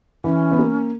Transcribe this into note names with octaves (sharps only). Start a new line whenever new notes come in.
E3 C#4
B3
A#3